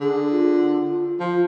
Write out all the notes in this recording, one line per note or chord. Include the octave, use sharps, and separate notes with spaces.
D3 G#4
F4
F3